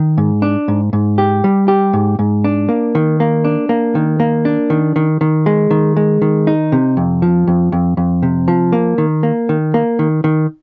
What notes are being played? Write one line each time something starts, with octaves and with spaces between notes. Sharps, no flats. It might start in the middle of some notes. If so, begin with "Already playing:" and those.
Already playing: D#3
G#2
D4
G#2
G#2
G4
G3
G4
G#2
G#2
D4
A#3
D#3
A#3
D4
A#3
D#3
A#3
D4
D#3
D#3
D#3
G#3
D#3
G#3
D#3
D#4
C3
F2
F3
F2
F2
F2
C3
F3
A#3
D#3
A#3
D#3
A#3
D#3
D#3